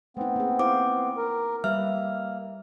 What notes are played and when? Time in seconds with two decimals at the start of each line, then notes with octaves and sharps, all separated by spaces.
0.17 A3 B3 C4 D#4
0.36 A#3 G#4
0.59 E4 C5 F5 D6
1.17 A#4
1.64 G3 A#3 G4 B4 E5 F6